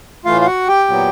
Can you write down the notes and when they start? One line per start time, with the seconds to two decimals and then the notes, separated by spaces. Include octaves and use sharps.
0.25 A2 E3 A3 F4 F5
0.42 F5
0.46 F#4 F#5
0.68 G4 G5
0.88 A#2 F#3 B3